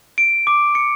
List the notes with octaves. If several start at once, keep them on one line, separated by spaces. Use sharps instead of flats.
D7
D6
C#7